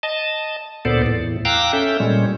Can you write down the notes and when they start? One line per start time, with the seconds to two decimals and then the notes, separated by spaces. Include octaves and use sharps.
0.03 D#5 A5
0.85 D2 A#2 B3 A4 C5 D5
1.06 E2 A2
1.45 F5 G5 A#5 D6 E6 F#6
1.73 C#4 A4 E5 G6
2.00 A#2 G3 G#3 C#4